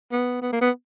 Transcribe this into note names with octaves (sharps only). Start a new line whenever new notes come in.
B3
B3
A#3
B3